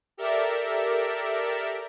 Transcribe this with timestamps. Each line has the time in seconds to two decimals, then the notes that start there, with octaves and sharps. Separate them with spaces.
0.17 G4 A4 A#4 D5 E5